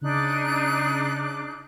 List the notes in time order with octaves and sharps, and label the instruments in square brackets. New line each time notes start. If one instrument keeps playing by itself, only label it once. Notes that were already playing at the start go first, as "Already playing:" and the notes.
[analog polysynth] C#3 D6 [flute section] D4 D#4 F#6